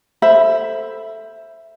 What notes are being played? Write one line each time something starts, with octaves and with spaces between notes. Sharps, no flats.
A4 C5 E5 B5